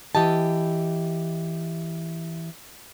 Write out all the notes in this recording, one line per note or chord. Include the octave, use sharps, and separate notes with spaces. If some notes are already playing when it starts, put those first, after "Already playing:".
E3 G4 D#5 A5